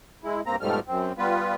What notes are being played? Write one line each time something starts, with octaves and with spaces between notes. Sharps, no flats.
G#3 E4
G2 A#3 C4 A#5
G#2 B2 F3 G3 A3 F6
F#2 C4
G3 B3 F4 B4